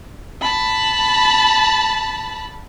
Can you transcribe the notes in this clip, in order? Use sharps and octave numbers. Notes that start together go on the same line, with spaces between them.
A5 B5